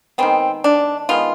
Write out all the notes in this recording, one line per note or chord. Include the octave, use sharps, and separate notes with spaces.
D#3 G#3 B3 C4
D4
D#3 G#3 B3 F4